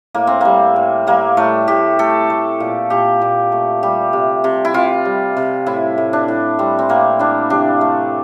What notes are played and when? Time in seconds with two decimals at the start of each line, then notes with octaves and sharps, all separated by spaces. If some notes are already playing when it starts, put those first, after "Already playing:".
0.14 A2 A#3
0.27 C4
0.41 G3 A#3
0.76 A2
1.07 G3 A#3
1.37 A2 A3
1.68 A2 G4
1.99 A3 A4
2.30 A3
2.60 A#2
2.90 A#2 G4
3.22 A#2
3.52 A3
3.83 G3 G4
4.13 C3
4.44 C3
4.65 E4
4.74 C3 F4
5.05 G3
5.37 C3
5.66 A2 E4
5.98 A2
6.13 D4
6.28 A2
6.59 G3 C4
6.79 C4
6.89 A2 A#3
7.19 E3 D4
7.50 C3 D4
7.81 A3